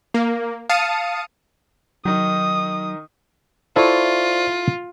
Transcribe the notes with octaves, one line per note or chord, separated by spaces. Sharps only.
A#3
F5 A5 D#6 C#7 D#7
D#3 F#3 D#4 D#6
E4 F4 A4 C5 D5 E5 C#6